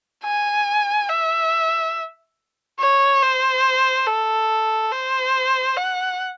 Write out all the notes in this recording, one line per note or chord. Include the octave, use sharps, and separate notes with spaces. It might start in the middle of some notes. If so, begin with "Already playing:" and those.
G#5
E5
C#5
C5
A4
C5
F#5